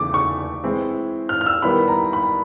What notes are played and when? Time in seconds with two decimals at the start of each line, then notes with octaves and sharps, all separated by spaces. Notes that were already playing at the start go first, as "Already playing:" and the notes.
Already playing: E2 C#3 E3 A3 D6
0.14 C#6
0.64 E3 G#3 C4 E4
1.29 F6
1.41 F6
1.46 E6
1.62 D#3 G3 B3 E4 B5
1.88 A#5
2.13 B5